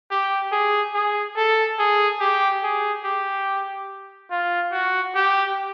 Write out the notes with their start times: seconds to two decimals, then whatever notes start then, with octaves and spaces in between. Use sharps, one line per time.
0.11 G4
0.52 G#4
0.94 G#4
1.36 A4
1.79 G#4
2.20 G4
2.63 G#4
3.04 G4
4.31 F4
4.72 F#4
5.15 G4